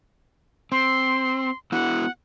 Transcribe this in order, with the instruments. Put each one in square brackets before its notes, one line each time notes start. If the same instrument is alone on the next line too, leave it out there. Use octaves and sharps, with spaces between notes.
[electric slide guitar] C4 [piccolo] C6
[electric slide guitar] B3 E4 F#4 [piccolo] F#5